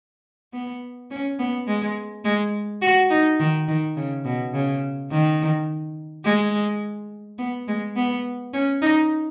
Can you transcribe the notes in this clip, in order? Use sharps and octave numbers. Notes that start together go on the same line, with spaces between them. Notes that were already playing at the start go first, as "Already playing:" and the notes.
B3
C#4
B3
G#3
G#3
F#4
D#4
D#3
D#3
C#3
B2
C#3
D#3
G#3
B3
G#3
B3
C#4
D#4